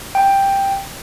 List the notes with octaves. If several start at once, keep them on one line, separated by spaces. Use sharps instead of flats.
G5